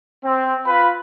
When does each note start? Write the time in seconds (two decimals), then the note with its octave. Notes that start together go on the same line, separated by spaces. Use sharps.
0.24 C4
0.66 F4 B4 B5